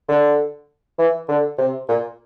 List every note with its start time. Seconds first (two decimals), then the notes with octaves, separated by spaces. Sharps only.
0.08 D3
0.99 E3
1.29 D3
1.58 C3
1.89 A#2